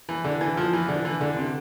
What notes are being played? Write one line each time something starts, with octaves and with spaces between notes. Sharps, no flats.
E3
D3
E3
F3
E3
D3
E3
D3
C3